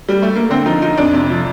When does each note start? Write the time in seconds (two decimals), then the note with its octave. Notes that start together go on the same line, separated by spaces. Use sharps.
0.09 G3
0.22 A3
0.36 A#3
0.50 D3 C4
0.65 F3 D#4
0.82 F3 D#4
0.97 F2 D4
1.13 C3
1.30 F3